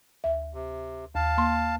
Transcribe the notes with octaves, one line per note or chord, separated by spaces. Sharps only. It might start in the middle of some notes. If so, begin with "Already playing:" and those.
D2 E5
C3
D#2 F5 A5
A#3 C6